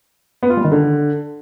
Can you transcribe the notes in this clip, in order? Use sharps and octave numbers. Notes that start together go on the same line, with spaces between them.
B3
F4
G3
D#3
D3